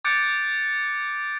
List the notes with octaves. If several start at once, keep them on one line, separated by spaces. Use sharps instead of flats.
D6 F#6 G6 A6 C#7 D7